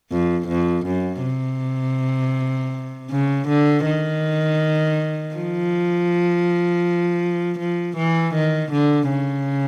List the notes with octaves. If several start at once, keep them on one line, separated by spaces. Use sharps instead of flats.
F2
F2
F#2
C3
C#3
D3
D#3
F3
F3
E3
D#3
D3
C#3